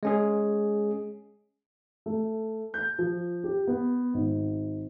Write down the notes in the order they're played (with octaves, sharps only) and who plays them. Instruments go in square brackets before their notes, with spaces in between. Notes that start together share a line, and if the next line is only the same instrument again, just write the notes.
[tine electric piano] G#3 C#4 G#4
[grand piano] A3
G6
F3
G4
B3
G#1